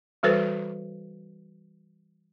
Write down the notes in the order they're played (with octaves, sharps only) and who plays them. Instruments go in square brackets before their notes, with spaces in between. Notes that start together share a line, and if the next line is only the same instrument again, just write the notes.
[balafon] E3 G3 F#4 A4 B4 C5